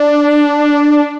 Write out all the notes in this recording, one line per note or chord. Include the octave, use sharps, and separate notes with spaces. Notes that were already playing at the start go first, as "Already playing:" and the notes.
Already playing: D4